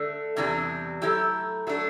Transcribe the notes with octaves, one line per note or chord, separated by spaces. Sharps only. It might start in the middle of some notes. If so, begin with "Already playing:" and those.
Already playing: D3 A3 D4
E2 C3 E3 G3 D4
F#3 A3 E4 G4
F#3 A3 D4